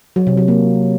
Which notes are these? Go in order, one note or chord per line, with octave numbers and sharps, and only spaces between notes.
F#3
C3
F#3
A#3